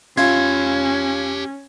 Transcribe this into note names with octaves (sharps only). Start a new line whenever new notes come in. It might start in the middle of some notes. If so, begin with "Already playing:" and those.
C#4 F4 G4 E5 F5 G#6